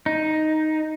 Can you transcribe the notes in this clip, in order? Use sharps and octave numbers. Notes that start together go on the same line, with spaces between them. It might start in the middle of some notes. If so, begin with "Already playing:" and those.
D#4